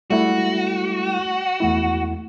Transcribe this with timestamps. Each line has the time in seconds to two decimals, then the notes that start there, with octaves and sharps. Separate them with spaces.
0.10 G3 A3 E4 F#4
1.60 E2 A3 E4